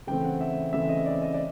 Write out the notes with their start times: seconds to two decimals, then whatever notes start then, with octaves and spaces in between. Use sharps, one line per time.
0.07 C#3 E3 A3 C4 G5
0.25 F#5
0.41 E5
0.73 C#3 E3 A3 C4 E5
0.89 D#5
1.06 D5
1.22 D#5
1.34 D5